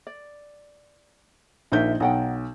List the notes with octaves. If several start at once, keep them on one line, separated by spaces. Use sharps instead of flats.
D5
A#1 D#4 F4 A#4 E5 G6
B1 D#4 F#5 G5